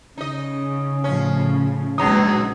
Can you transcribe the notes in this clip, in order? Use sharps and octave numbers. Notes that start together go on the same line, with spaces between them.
C#3 D#4 D#5
A2 F3 C#4
A#1 B2 F#3 G#3 D#4 A#5 D#6